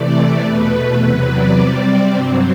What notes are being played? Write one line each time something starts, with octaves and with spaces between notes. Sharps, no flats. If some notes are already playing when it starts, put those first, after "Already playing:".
Already playing: C3 E3 A3 D5
E2 B2 A3 B4
B4
E2 C3 F#3
D5
C3 G3 C4
G2 F#3 C4